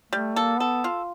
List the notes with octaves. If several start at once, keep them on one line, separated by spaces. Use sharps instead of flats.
G3 A3
A#3 A4
B3 A4
F4